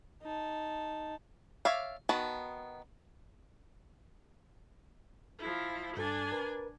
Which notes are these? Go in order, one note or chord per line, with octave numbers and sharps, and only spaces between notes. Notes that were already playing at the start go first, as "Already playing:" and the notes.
D#4 A5
C#5 D5 E5 F5
D#3 B3 F#4 A5
F3 E4
G2 D4 A4 G#5 A6
A#4 B4